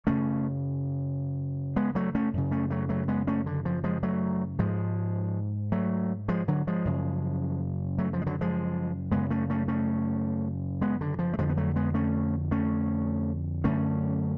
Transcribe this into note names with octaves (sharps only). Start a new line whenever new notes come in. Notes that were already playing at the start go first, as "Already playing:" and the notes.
F#2 C#3 A3 C#4
G#3 B3
F#3 A3
A3 C#4
F#2 C#3
A3 C#4
F#3 A3
F#3 A3
G#3 B3
A3 C#4
D3
F3
F3 G#3
F#3 A3
G#2 F3 G#3
F#3 A3
F3 G#3
D3 F#3
F3 G#3
F#2 C#3
F#3 A3
F3
G#3
D3 F#3
F3 G#3
F#2 C#3 G#3 B3
A3 C#4
A3 C#4
A3 C#4
G#3 B3
D3
F3
A3
F2 D3 F3 G#3
B3
F#3 A3
G#3 B3
A3 C#4
A3 C#4
F#2 D3 A3 C#4